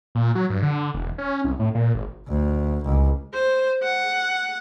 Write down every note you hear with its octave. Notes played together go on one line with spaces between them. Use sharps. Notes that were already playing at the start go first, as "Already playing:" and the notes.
A#2
F#3
G2
D3
E1
C#4
C2
A2
A#2
G#1
D2
C#2
C5
F#5